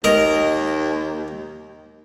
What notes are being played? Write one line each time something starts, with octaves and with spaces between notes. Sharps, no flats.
D#2 A#4 D#5